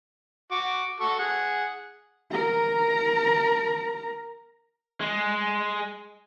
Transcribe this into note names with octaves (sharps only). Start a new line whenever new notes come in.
F#4 D6
F#4 A4 C#6
G#4 F#5
A#4 A#5
G#3